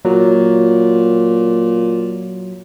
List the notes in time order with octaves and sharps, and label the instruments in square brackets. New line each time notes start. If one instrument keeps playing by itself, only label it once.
[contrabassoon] A#2 [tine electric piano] F#3